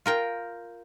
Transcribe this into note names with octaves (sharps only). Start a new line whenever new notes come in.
F4 A#4 G5